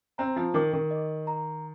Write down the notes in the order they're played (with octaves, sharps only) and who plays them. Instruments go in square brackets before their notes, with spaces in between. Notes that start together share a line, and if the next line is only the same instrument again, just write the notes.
[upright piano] C4 [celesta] A#5
[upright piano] F3
[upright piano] D#3 [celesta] D6
[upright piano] D#3
[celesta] D#5
A#5